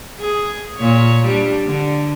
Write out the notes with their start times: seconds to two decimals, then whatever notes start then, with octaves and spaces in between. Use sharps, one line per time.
0.20 G#4
0.78 A#2 C#5
1.25 G3 D4
1.66 D3